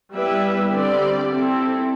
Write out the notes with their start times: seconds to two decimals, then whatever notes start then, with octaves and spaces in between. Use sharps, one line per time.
0.12 G3 B3 E4 B4 E5
0.72 D3 G3 C4 G4 D5
1.30 C4 E4 A4